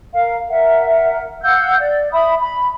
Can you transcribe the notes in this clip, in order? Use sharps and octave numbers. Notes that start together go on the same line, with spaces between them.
A#4 F5
A#4 E5 F#5
F5 F#5 E6 G6
D5
E5 B5 D#6
B5